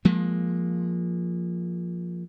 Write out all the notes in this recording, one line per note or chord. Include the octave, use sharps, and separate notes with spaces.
F3 G#3 A#3